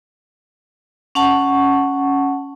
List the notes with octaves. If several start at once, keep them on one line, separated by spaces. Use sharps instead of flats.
C#4 F#5 A5 C#6